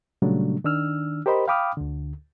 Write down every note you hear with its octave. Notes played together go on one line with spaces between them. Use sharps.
A#2 C#3 F#3 G3 A3 D4
D#3 D4 E6 F6
G4 A#4 C5 D#5 B5
F5 G5 B5 D6 D#6 F6
D2 D3